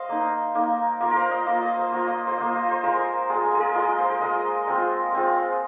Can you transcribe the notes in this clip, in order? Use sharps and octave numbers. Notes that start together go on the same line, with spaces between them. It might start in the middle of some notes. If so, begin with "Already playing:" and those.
Already playing: C5 D#5 F5
A#3 D#4
A#3 D#4
A#3 F4 A#4
A#4 C5
D#5
A#3 F4 F5
D#5
C5
A#3 F4 A#4
D#5
C5
A#3 F4 D#5
C5
C5
G#3 F4 A#4
G#3 F4 G#4
A#4
G#4
A#4
G#3 F4 D#5
C5
A#4
G#3 F4 D#5
G#3 C4 F4
G#3 C4 F4